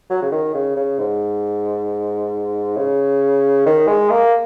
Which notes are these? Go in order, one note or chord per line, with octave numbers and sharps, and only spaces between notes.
F#3
C#3
D#3
C#3
C#3
G#2
C#3
D#3
G#3
A#3